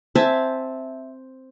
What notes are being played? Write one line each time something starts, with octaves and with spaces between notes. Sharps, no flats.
C4 E5 G#5 A5